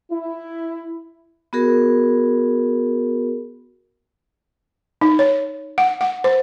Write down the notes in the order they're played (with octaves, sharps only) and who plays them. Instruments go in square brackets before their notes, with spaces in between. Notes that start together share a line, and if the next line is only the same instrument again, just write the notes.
[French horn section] E4
[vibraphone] B3 F#4 G#4 A#4
[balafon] D#4
C#5
F#5
F#5
C5